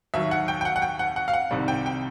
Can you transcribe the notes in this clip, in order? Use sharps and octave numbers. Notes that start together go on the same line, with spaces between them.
D#2 D#3 F#3 E5
F#5
G5
G5
F#5
F#5
G5
F#5
F#5
F5
F#5
C2 C3 D#3 G3
G5
G5